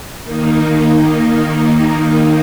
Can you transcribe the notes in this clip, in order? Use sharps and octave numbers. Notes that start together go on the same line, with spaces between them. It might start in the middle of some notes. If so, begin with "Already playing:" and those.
D#3 A#3 D#4